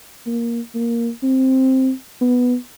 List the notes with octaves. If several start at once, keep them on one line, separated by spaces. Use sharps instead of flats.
A#3
A#3
C4
B3